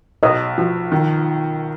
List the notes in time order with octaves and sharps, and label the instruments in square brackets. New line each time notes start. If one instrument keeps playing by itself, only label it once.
[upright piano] B1 [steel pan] D#5
[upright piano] F3
D#3